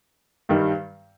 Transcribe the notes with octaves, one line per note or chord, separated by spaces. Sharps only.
G2 D#3 G3